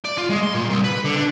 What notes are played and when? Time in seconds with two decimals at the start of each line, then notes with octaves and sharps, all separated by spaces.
0.05 D5
0.18 F4
0.30 G#3
0.43 C6
0.55 A#2
0.69 C2
0.84 B4
1.05 D3
1.17 D4